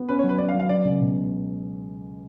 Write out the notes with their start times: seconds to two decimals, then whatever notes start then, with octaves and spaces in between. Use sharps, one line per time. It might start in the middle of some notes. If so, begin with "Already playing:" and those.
Already playing: B3
0.09 C#4 B4
0.19 C#5
0.24 F#3
0.29 B4
0.38 C#4 D5
0.49 F5
0.54 F#3
0.60 F5
0.69 F#3 D5
0.85 C#2
1.00 B2